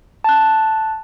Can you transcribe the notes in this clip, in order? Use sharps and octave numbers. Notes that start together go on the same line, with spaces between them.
A5 F#6